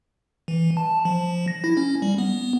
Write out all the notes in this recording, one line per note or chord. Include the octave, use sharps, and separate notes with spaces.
E3
A5
F3
A#6
E4
C#4
G3
B3